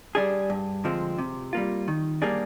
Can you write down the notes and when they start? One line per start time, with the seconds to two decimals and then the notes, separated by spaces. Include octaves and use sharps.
0.15 G3 D4 G#4
0.50 G2
0.84 D3 F3 G#3 C4
1.18 C3
1.53 G3 A#3 F4
1.88 D#3
2.22 G3 A#3 D4 G#4